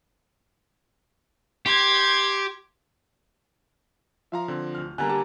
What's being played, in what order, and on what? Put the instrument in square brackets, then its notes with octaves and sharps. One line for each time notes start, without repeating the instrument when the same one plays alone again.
[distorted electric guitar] G4 [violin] C6 G#6
[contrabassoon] F3 [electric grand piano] E5 F5 A#5
[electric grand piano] D3 C4
[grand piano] D1 F6
[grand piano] D3 G3 A#3 [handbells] G#5 A#5 [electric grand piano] F#6
[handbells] G4 [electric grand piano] A5